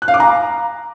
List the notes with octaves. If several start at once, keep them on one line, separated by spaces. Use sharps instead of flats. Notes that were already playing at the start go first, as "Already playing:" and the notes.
F#6
F5
D6
A#5